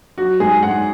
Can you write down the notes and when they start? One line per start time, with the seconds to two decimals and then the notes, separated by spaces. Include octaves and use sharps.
0.18 F#3 F#4
0.40 G#2 G#4
0.63 G#2 F#5